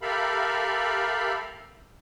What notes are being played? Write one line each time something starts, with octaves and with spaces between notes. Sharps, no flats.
G4 A4 A#4 E5 F5 B5